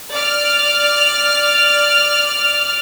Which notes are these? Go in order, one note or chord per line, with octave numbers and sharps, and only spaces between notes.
D5 F6